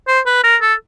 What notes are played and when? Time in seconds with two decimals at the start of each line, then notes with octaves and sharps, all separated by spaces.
0.08 C5
0.26 B4
0.44 A#4
0.61 A4